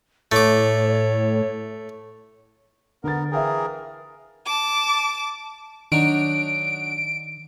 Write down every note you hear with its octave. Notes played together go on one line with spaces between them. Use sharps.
A2 A3 C#5 D6
D3 B3 A#4 A6
E3 G#4 A#4 E5 F5 G5
A5 D6
D#3 F#3 D4 D#4 D7